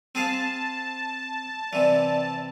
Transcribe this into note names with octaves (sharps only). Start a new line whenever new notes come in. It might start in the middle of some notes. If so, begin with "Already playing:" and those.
C4 G#4 F5 A5
C3 E3 D5